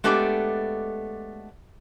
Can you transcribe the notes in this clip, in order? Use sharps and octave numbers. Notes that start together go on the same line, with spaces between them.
G#3 A3 B3 D4 G4 A4